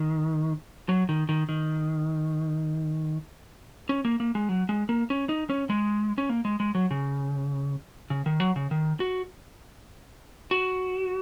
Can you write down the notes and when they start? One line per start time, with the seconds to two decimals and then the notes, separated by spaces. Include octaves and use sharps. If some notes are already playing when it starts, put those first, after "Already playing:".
Already playing: D#3
0.89 F#3
1.09 D#3
1.29 D#3
1.49 D#3
3.89 C#4
4.05 A#3
4.20 A#3
4.35 G#3
4.49 F#3
4.69 G#3
4.89 A#3
5.10 C#4
5.29 D#4
5.50 C#4
5.70 G#3
6.18 C#4
6.29 A#3
6.45 G#3
6.60 G#3
6.75 F#3
6.91 C#3
8.10 C#3
8.26 D#3
8.40 F#3
8.56 C#3
8.71 D#3
9.00 F#4
10.51 F#4